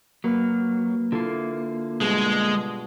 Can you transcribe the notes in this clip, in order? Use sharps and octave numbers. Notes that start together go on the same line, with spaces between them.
F#3 A#3 B4 F6
D3 A#3 E4 F4 A4
G2 B2 G#3